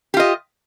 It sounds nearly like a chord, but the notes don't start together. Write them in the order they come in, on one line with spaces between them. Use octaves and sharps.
G4 F4 D#5